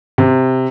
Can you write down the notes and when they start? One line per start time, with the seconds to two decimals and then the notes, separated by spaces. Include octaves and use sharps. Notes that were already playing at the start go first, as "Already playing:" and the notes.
0.18 C3